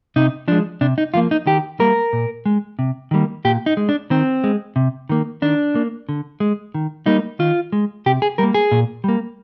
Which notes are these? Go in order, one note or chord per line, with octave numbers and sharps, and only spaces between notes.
C3 D#4
F3 G#3 D4
C3 D4
D#4
F3 A#3 F4
D#4
D#3 G4
G3 A#3 A#4
A#2
G#3
C3
D#3 G3 A#3
A#2 G4
D#4
G#3
D4
D#3 C4
G#3
C3
D#3 A#3
D#3 D4
A#3
D3
G#3
D#3
G3 A#3 D#4
D#3 F4
G#3
C3 G4
G#4
G3 A#3 A#4
G#4
A#2
G3 A#3